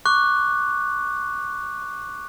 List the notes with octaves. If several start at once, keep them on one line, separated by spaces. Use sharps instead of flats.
C#6 D6 F#6